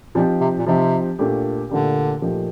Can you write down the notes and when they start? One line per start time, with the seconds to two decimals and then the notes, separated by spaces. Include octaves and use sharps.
0.15 A#2 F3 C4 D#4 G4
0.41 C3
0.58 A#2
0.66 C3 F3 C4 D#4 G4
1.19 A#2 A3 D4 G4
1.69 A#2 D3 A3 D4 G4
2.22 A#2 F3 A3 D#4 G4